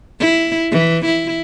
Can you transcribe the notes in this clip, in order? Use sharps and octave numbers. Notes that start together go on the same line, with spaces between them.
E4
E3
E4